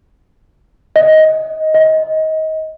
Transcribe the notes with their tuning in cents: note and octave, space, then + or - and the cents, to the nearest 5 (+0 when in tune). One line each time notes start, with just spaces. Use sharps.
D#5 +10
D#5 +25